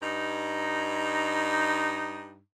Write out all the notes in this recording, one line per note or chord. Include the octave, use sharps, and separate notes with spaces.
G2 D#4